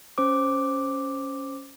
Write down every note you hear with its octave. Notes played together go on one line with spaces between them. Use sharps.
C#4 C5 D6